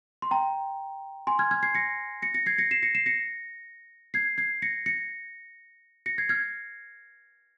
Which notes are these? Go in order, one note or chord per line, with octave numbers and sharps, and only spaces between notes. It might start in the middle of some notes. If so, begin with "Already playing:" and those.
C6
G5 A#5
G#5 C6
F6 G#6
F6 G#6
G#6 C7
A#6 C#7
A#6 C#7
A#6 C#7
G#6 C7
A#6 C#7
C7 E7
A#6 C#7
C7 E7
A#6 C#7
G#6 C7
G#6 C7
A#6 C#7
A#6 C#7
A#6 C#7
G#6 C7
F6 G#6